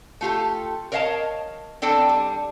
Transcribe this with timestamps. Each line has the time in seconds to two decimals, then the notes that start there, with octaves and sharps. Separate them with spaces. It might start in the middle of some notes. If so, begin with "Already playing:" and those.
0.21 A3 F4 G4 A4
0.92 A#4 C#5 D#5 F5 G5 A5
1.82 C4 D4 A4 G5 A5
2.09 G3